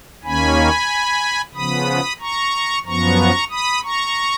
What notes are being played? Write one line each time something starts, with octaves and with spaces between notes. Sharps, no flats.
D#2 D#3 A#3 C#4 G#5 B5
C#3 F3 B3 B5 D#6
A#5 C#6
F#2 F3 B3 A#5 C#6
B5 D#6
A#5 C#6